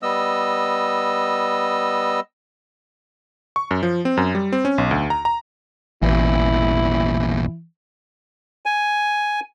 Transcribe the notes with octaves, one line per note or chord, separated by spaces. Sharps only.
G3 B3 D#5 E6
C#6
F#2
F3
C4
F#2
G3
C4
C#4
B1
D2
A#5
A#5
A1 E2 A#2 E4
G#5